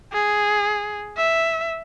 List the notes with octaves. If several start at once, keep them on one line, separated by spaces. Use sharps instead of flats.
G#4
E5